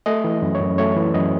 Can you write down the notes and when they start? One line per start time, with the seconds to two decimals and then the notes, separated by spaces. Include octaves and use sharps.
0.06 A3 D#5
0.24 E3
0.42 F#2
0.55 C#5
0.61 F#2
0.78 A3 C#5
0.97 E3
1.14 F#2 D#5